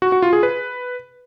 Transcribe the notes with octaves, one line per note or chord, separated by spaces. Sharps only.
F#4
F#4
F4
G#4
B4